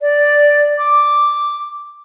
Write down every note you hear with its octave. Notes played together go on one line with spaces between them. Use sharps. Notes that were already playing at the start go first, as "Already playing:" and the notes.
D5
D6